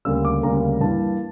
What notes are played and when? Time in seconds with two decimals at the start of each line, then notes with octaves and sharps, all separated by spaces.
0.05 D2 C#3 G3 A#3 E6
0.25 D6
0.43 D2 C#3 G3 A#3 A#5
0.80 G2 E3 A#3 A5